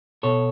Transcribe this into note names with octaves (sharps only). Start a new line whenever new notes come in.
B2 A4 C#5